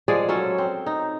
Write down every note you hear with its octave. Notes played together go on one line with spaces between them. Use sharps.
F3 G#3 G#4 D5
F#3 C#4 A4
C4
D#4